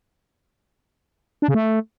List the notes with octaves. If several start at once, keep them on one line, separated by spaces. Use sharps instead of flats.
D4
C#3
A3